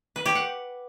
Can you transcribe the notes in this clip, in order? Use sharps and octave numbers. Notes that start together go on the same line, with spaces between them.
B4
G4
F#5